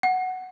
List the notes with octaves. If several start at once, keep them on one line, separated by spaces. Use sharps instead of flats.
F#5